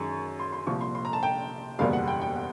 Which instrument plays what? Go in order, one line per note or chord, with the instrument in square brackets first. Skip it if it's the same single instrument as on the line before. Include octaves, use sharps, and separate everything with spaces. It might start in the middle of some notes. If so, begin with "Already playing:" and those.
Already playing: [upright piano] F#2 D#3 G#3 C#6
C6
C6
C2 A#2 F3 C#6
C6
C6
A#5
A5
G5
F#1 E2 B2 G3 A#3 F5
F#5
G5
G5
F#5